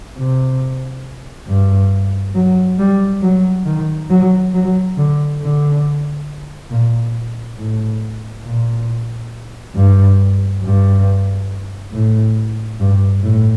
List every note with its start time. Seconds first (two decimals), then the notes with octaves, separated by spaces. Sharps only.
0.18 C3
1.49 G2
2.35 F#3
2.79 G3
3.23 F#3
3.66 D#3
4.10 F#3
4.54 F#3
4.97 D3
5.41 D3
6.71 A#2
7.58 A2
8.45 A#2
9.76 G2
10.63 G2
11.93 A2
12.80 G2
13.23 A2